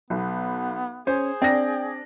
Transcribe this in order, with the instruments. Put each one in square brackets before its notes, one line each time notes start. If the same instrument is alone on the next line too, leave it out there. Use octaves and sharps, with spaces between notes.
[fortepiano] B1 [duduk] B3
[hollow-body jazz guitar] C#4 [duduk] G#4 [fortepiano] C5
[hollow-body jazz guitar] C4 [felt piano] D4 D5 A#6 [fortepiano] G5